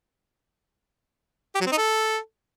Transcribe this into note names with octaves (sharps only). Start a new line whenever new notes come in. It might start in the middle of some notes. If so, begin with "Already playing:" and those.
G4
F#3
C4
D#4
A4